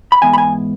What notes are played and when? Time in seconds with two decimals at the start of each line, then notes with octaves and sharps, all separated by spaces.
0.12 B5
0.22 G#2 E3 B3 G#5
0.33 B5
0.38 G#5